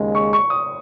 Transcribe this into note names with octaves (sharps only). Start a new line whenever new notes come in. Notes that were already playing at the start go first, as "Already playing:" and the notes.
Already playing: D#2 C#3 G#3
C#6
C#6
D#6